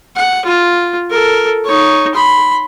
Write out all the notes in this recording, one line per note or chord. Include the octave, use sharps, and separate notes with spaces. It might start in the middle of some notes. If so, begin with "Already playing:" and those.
F#5
F4
A4 A#4
D#4 C#5
B5 C6